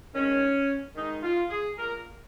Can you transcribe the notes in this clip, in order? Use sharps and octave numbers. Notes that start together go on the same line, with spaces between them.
D#3 G#3 C#4
D#3 G#3 D#4
F4
G#4
A#2 A#3 A#4